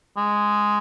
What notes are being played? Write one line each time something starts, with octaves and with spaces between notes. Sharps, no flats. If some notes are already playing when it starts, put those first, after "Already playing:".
G#3